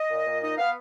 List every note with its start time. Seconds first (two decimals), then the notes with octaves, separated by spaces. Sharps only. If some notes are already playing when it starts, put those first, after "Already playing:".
Already playing: D#5
0.10 A#2
0.26 A#2
0.42 D#4 D#5
0.58 B3 F5